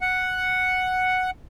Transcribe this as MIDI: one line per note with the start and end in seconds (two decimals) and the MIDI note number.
0.01 1.31 78